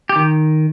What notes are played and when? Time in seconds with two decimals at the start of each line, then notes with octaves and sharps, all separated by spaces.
0.09 G4
0.16 D#3